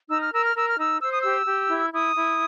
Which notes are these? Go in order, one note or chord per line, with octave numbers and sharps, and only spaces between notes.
D#4 E6
F6
A#4 E6
F6
A#4 E6
F6
D#4 E6
C5 E6
D#6
G4 E6
G4
E4
E4 D#6
E4